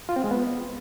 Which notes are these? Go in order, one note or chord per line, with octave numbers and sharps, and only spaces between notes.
F4
C4
G#3
B3